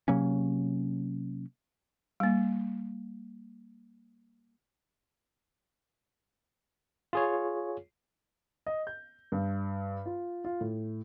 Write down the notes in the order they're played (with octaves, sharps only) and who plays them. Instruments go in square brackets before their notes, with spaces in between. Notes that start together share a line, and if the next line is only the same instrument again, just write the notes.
[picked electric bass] C3 F#3 A#3 C#4
[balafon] G3 A#3
[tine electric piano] F4 G#4 C#5
[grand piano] D#5
G6
G2
F4
F4
A2